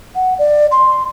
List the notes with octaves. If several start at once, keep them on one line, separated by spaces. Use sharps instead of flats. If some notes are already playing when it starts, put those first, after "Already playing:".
F#5
D5
C6